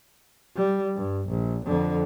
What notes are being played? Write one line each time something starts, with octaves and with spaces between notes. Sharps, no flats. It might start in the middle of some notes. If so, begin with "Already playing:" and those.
G3
G2
A#1
F2 D3